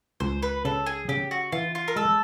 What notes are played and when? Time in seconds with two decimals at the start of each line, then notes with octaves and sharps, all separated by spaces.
0.20 C#2 C5
0.42 B4
0.65 C#3 A4
0.86 G#4
1.09 C#3 G4
1.31 F#4
1.52 E3 F4
1.75 F4
1.88 A#4
1.96 G#3 A4